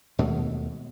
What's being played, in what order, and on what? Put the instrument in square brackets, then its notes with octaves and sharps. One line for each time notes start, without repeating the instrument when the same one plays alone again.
[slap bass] D#2 B2 G#3 A3